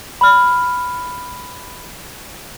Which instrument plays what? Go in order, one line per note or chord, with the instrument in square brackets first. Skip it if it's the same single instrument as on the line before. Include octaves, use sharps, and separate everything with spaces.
[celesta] B5 F6